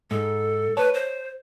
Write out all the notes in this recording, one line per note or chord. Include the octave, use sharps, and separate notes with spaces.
G#2 A4
B4 C#5 A5
C5